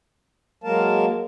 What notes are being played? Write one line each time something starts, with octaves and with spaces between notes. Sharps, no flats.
F#3 G#3 A#3 A#4 F5 A5